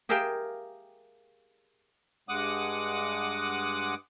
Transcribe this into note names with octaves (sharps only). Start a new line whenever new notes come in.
G4 G#4 A#4 E5 F5 G5
G2 G#3 F#5 D6 D#6 F#6